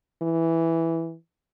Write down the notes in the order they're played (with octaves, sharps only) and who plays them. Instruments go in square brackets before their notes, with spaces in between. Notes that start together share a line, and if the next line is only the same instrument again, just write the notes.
[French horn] E3